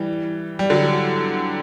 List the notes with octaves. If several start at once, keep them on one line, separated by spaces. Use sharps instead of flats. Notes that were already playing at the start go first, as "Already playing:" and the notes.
Already playing: E3 G3
G3
D3 F#3